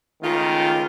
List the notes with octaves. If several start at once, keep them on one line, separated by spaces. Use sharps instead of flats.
C#2 D#3 A3 F4